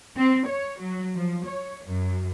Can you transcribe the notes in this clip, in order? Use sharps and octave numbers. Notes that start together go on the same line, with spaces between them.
C4
C#5
F#3
F3
C#5
F#2